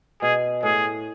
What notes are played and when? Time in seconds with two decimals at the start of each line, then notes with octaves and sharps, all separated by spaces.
0.22 B2 G#4
0.63 A2 G#4